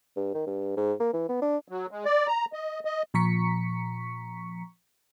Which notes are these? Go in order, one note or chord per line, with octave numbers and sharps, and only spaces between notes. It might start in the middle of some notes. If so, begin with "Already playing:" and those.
G2
D#3
G2
G#2
A#3
E3
B3
D4
F#3
G#3
D5
A#5
D#5
D#5
A#2 F3 A#5 C#6 B6 C#7